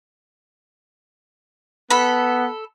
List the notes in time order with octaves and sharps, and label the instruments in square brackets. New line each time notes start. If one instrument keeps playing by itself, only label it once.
[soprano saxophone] B3 [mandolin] A4 B5